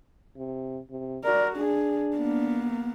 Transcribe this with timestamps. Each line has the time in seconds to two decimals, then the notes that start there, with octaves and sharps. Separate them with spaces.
0.37 C3
0.90 C3
1.24 F#4 A#4 D5
1.57 D4 G#4
2.16 A#3 B3